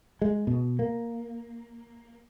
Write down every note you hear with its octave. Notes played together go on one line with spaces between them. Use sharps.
G#3
B2
A#3